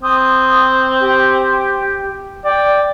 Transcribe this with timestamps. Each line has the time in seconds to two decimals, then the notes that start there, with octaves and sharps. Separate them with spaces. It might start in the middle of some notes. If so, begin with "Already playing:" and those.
0.03 C4 D#6
1.00 G4
2.45 D5 G5